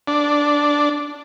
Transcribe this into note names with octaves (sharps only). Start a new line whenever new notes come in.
D4